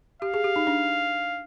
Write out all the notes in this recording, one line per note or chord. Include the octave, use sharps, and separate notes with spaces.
G4 F5
G#4
G4
D#4
D4